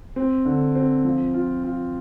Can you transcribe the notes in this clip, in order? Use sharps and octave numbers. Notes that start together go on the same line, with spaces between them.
C4
D3
C4
F3
F4
F4